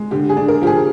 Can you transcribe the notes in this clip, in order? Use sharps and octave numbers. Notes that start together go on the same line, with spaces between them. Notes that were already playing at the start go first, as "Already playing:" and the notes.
Already playing: G#3
D3 G4
G#4
D4
A#4
F3 G4
G#4